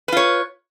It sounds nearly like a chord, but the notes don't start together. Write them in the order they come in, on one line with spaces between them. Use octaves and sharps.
B4 F4 C#5